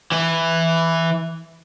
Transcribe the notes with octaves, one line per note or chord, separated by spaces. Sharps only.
E3 E4